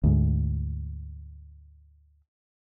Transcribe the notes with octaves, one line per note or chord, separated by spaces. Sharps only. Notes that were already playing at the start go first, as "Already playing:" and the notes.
D2 G#2